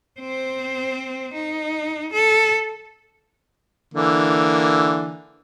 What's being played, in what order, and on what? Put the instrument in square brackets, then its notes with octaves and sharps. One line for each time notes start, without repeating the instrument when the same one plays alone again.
[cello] C4 C5
D#4
A4
[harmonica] D3 E3 A#3